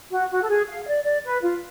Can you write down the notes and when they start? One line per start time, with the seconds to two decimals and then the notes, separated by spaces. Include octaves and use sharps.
0.11 F#4
0.31 F#4
0.42 A4
0.49 G#4
0.69 F5
0.83 F5
0.88 D5
1.05 D5
1.25 B4
1.43 F4